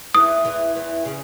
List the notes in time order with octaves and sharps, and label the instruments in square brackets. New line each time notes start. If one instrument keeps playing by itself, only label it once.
[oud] E2 E3 [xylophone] D#6
[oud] E2 E3
E2 E3
C#3